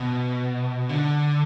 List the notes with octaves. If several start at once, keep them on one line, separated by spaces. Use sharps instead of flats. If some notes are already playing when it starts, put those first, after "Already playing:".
Already playing: B2
D3